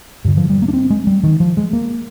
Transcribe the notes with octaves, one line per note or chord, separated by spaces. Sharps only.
G2 D3
F3
G3
A#3
D4
C4
G#3
G3
D#3
F3
G#3
A#3